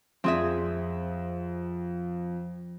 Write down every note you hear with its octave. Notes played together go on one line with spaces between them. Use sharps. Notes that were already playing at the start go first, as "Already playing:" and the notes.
F2 C4 G#4 E5